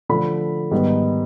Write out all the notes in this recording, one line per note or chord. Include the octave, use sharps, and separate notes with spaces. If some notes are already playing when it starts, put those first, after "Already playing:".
D3 F3 A3 B5
G#2 D#3 G3 B3